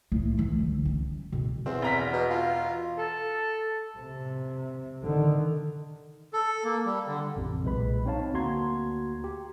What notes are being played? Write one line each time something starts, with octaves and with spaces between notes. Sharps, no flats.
A2 A3
E3 A3
D2
C#4
B2
E2 C4
E1 A#5 B6
B2
F4
A4
C3
D3 D#3
A4
A#3
G3
D3
A1 F2 C3
B1 A#2 G#3 B4 B5
C4 D#4 C#5 F5 A5
D2 A#3 F#4 A#5 C6 G#6
G4